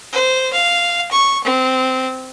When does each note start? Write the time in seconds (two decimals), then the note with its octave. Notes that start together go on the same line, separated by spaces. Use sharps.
0.13 C5
0.53 F5
1.11 C#6
1.44 C4